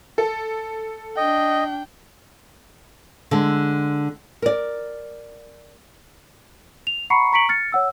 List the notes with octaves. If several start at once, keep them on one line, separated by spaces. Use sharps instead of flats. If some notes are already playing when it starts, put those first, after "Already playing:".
A4
D4 D#5 G5
D3 G#3
A#4 D5
F7
F#5 A#5 B5 C#6 C7 C#7
A#5 C#6 B6 C#7 D7 F#7
F6 A6 C#7
C#5 F#5 E6